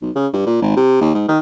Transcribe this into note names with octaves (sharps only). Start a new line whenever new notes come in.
B1
C#3
G2
A#2
G#1
C3
D#2
G#2
D#3